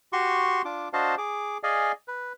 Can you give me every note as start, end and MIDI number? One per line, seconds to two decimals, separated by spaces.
0.13 0.62 66
0.13 0.62 67
0.13 0.62 84
0.13 0.62 85
0.65 0.88 62
0.65 0.88 65
0.65 0.88 86
0.93 1.15 62
0.93 1.15 66
0.93 1.15 72
0.93 1.15 75
0.93 1.15 77
0.93 1.15 81
1.18 1.58 68
1.18 1.58 86
1.63 1.92 68
1.63 1.92 74
1.63 1.92 75
1.63 1.92 77
1.63 1.92 80
2.08 2.33 71